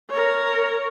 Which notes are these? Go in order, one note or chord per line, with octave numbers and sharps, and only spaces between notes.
A#4 C#5